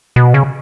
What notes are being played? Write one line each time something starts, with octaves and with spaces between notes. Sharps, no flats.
B2
C#3